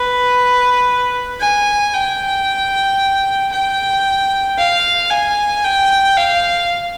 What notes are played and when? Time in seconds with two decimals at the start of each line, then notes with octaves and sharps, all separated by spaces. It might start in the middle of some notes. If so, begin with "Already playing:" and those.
Already playing: B4
1.40 G#5
1.93 G5
3.52 G5
4.58 F5
5.10 G#5
5.64 G5
6.17 F5